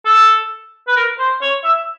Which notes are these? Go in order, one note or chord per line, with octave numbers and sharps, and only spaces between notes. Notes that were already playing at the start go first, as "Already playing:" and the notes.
A4
B4
A#4
C5
C#5
E5